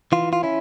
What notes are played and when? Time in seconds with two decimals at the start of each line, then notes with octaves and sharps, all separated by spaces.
0.12 E3 F4
0.33 F4
0.43 C#4 E4